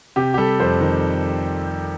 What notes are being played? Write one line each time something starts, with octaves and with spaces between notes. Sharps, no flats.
C3 G4
G4
G3 A4
F2 C5
D#3